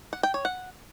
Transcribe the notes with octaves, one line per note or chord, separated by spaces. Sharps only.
F#5
G5
C#5
F#5